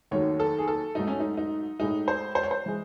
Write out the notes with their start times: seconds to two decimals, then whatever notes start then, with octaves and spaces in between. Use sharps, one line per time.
0.11 D#2 D#3 F#3 A3 C#5
0.40 A4
0.59 G#4
0.68 A4
0.95 G#2 F#3 A3 D#4
1.07 C#4
1.20 D#4
1.37 D#4
1.79 A2 G#3 D#4
2.08 C5
2.35 C5
2.43 C#5
2.51 C5
2.66 E3 G#3